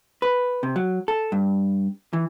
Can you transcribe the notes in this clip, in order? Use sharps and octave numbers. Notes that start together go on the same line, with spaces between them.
B4
C3
F#3
A4
G2
E3